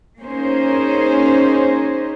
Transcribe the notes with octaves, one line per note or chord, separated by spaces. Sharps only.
A#3 C#4 D#4 G#4 C5